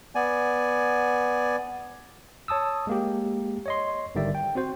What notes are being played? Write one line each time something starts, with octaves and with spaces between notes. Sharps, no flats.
B3 D5 G#5
C#5 A5 D#6 E6
G#3 A#3 G4
C#5 D#5 C6
G#1 D3 D#3 G3 D5 E5
G5
C4 F#4 C5